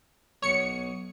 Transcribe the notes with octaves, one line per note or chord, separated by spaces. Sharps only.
B1 B2 C#5 C#7